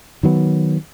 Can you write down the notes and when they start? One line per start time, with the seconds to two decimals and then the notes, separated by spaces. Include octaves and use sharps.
0.23 D#3 F#3 B3